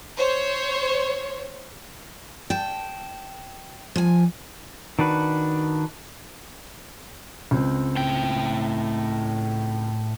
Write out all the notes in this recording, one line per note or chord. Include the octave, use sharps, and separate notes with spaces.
C5 C#5
G5 A5
F3 G#5
D#3 D4 F#4 B4
C#2 C4
A2 G5